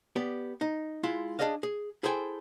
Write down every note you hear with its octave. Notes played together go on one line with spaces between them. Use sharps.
B3 G4 D5
D#4
G#3 E4 F4
D4 D#4 G#4 D5 D#5 F5
G#4
E4 G#4 A4 C5 G5 G#5